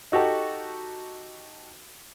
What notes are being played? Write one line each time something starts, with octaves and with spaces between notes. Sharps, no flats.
D#4 F#4 G4 A4